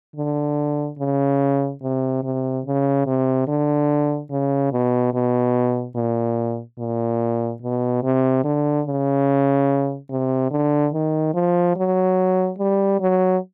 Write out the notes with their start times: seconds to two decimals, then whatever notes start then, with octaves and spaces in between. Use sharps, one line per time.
0.16 D3
0.99 C#3
1.82 C3
2.23 C3
2.65 C#3
3.07 C3
3.48 D3
4.30 C#3
4.72 B2
5.14 B2
5.96 A#2
6.78 A#2
7.62 B2
8.03 C3
8.44 D3
8.87 C#3
10.10 C3
10.51 D3
10.94 D#3
11.34 F3
11.76 F#3
12.58 G3
13.00 F#3